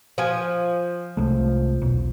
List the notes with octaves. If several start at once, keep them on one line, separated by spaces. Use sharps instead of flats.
F3 G#5
C2 G#3 A3
E1 B1